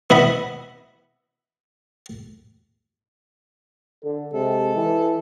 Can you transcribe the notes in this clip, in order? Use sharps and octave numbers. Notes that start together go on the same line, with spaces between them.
B3 E4 D#5 B5
D3 A4
C3 G#3 A4
E3